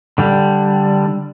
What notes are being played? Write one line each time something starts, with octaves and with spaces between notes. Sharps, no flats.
D3 G3